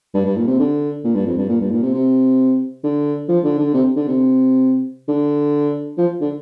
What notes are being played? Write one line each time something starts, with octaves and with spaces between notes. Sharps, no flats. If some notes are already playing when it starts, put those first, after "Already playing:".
G2
G2
A#2
C3
D3
A#2
G2
F2
G2
A#2
G2
A#2
C3
C3
D3
F3
D3
D3
C3
D3
C3
D3
F3
D3